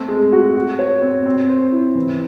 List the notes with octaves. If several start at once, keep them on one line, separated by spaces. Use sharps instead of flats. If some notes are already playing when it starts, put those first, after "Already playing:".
Already playing: A3 C4
G#3
F#4
F#4
C#5
C4
C4
C5
E4
E3